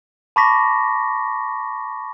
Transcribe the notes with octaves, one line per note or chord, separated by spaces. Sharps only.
A5 B5 C#6 D6 A#6 B6